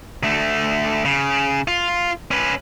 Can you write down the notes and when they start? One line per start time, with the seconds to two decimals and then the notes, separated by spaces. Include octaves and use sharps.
0.23 D2 A3
1.05 C#3
1.68 F4
2.31 C#4 B4